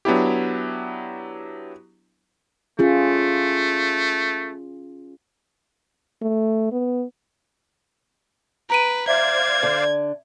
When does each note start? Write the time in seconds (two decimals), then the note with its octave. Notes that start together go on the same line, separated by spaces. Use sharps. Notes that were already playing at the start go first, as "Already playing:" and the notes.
0.05 F#3 B3 D4 E4 G4
2.79 A3 C#4 F4 G#4
6.22 A3
6.72 B3
8.70 B4 A#5 D7 D#7
9.08 C5 D5 E5 F5 G#6
9.63 D3 D4